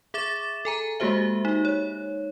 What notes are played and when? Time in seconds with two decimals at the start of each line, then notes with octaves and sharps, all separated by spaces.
0.14 G#4 E5 D6 A6 E7
0.65 A4 G#5 A#5
1.00 G#3 A#3 F#4 G4 C5 E5
1.45 D#4
1.65 C#5